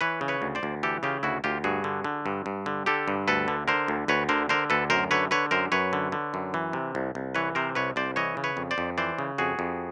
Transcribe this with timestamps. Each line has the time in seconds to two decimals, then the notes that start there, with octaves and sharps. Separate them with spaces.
0.01 E3 B4 C#5
0.21 C#3
0.28 B4 C#5
0.42 D2
0.55 C5 D5
0.63 D2
0.83 E3 G4 A4
1.03 C#3 F4 G4
1.23 D2 E4 F#4
1.44 D2 F4 G4
1.64 G2 F#4 G#4
1.84 D3
2.04 D3
2.26 G2
2.46 G2
2.66 D3
2.86 D3 G4 A4
3.08 G2
3.28 D2 A4 B4
3.48 D3
3.68 D3 A#4 C5
3.88 D2
4.08 D2 B4 C#5
4.29 D3 A#4 C5
4.49 D3 A#4 C5
4.70 D2 A4 B4
4.90 F#2 A#4 C5
5.11 D3 B4 C#5
5.31 D3 B4 C#5
5.51 F#2 A#4 C5
5.72 F#2 B4 C#5
5.93 D3
6.12 D3
6.34 F#2
6.54 E3
6.73 C3
6.95 C2
7.15 C2
7.35 E3 B4 C#5
7.55 C3 A#4 C5
7.75 C2 B4 C#5
7.96 C2 C5 D5
8.16 E3 C#5 D#5
8.37 C#3
8.44 B4 C#5
8.57 F2
8.71 C5 D5
8.78 F2
8.98 E3 C5 D5
9.18 C#3
9.38 F2 F#4 G#4
9.59 F2